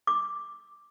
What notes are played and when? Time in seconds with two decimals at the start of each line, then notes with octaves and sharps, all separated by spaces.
0.07 D6